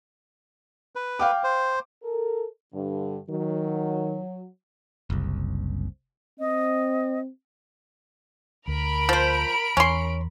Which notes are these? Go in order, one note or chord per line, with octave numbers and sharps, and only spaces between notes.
B4
F5 G5 D6
C5
A4 A#4
G2 D3
D#3 F#3
F#1 C2
C4 D#5
D2 A#4 B5 D7
F3 C5
E2 C#4 C6